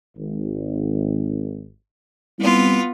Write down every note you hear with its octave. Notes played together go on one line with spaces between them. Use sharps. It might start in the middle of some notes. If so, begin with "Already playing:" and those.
G#1
G3 B3 C4 E4 F4